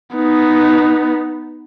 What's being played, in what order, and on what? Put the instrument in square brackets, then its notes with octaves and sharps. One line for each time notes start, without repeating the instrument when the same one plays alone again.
[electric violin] B3 D#4